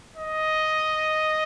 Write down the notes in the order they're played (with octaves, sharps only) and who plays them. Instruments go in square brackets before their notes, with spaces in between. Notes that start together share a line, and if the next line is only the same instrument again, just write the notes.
[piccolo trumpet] D#5